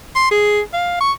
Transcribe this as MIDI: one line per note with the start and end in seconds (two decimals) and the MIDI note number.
0.16 0.31 84
0.31 0.60 68
0.73 1.00 77
1.00 1.12 85